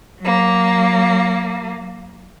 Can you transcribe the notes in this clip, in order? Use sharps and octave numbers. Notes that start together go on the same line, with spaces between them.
F#3 A#3